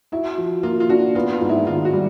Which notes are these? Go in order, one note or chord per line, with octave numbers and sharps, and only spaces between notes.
E4 F#4
F3
A#3 F4
F4
D4 F#4
B3 F4
F4
G#2
E4
D#3 F4
F#4
G3